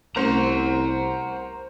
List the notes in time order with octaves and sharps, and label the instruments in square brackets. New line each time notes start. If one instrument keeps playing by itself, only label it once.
[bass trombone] C2 [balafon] A3 C#4 E4 [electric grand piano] A#4 C5 [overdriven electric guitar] F#5 A#5